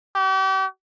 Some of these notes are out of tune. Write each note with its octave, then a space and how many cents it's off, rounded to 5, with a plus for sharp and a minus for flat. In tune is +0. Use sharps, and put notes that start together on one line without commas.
G4 -40